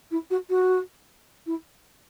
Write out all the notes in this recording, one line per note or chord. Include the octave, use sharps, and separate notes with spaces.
E4
F#4
F#4
E4